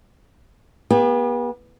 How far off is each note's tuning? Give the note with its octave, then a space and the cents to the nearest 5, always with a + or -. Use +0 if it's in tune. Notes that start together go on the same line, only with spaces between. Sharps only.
B3 -35 G4 +40